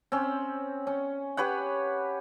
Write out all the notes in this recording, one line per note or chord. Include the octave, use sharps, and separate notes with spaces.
C4 C#4
C#4
G4 B4 C#5 F#5